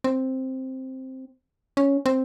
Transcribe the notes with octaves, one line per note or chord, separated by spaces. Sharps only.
C4
C#4
C4